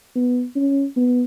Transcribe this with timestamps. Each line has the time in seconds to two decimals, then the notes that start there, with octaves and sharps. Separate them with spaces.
0.16 B3
0.56 C#4
0.97 B3